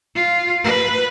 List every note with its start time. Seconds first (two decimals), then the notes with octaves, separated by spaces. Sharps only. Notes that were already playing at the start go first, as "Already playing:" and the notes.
0.15 F4
0.64 B4